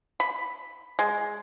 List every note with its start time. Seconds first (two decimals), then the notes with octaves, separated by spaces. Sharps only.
0.20 B5
0.99 G#3